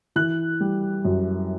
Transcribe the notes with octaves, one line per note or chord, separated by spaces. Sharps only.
E3 F#6
G3
F#2